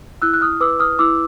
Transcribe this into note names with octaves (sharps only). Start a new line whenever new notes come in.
E4 E6 F#6
F#6
D#6 F6
B4 D6 E6
D#6 F6
E4 D6 E6